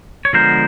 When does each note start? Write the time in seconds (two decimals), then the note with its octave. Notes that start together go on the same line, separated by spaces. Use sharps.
0.25 C#5
0.33 D3 F3 G#3 B3 A#4 C5